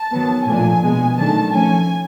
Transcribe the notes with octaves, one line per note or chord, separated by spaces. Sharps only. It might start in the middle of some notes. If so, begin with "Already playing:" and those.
Already playing: A5
D#3 F#3 B3
A#2 F3 A3 D4 G#5
B2 G#3 B3
D#3 F#3 A3 D4 A5
F3 A3 C#4 G#5